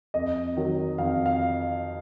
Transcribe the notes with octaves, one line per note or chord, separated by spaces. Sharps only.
F2 D#5
D#3 F#3
F2 F5
F5